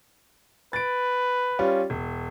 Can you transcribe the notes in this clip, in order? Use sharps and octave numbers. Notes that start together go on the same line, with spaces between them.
B4 A6 D7
G3 C#4 F4
E1